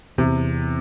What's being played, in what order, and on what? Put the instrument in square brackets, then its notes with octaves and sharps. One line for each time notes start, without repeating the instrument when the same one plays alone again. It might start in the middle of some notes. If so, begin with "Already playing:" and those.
[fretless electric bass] E2 [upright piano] C3